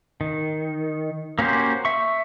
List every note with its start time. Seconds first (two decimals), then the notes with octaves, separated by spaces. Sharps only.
0.21 D#3
1.39 A#3 C#4 F#4 G4 C5
1.85 E5 C#6